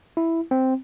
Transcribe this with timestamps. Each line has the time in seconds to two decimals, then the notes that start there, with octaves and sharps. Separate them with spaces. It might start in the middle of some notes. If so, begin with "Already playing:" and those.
0.17 E4
0.51 C4